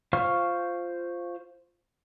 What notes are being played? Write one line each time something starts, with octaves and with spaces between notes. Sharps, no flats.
F4 C5 F5 C#6 F6